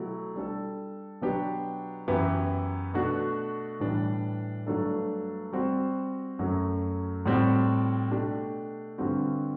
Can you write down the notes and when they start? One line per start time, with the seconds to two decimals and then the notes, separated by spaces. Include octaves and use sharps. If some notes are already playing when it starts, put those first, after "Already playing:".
Already playing: B2 F#3 A3 E4 G4
0.36 G3 D4 A4
1.21 B2 F#3 B3 D4 G4
2.08 F#2 E3 B3 E4 G4
2.94 B2 A3 D4 F#4
3.80 A2 E3 G3 D4
4.67 G2 F#3 A3 D4 A4
5.53 G3 C4 F#4 C5
6.39 F#2 F#3 A3
7.26 A2 G3 C4 F#4
8.11 B2 A3 D4 G4
8.98 G2 D3 G3 C4 F#4